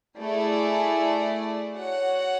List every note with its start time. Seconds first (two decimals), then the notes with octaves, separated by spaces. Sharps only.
0.18 A3 E4 G#4 D5
1.77 F#4 C#5 F#5